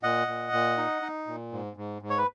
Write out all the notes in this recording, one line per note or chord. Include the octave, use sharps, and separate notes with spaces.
A#2 D#5 F#5
A#2
A#2
D#4
D#4
A#2
G#2
G#2
G#2
C#5
B4